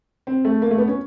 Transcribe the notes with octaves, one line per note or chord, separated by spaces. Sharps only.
C4
A3
A#3
A3
B3
C#4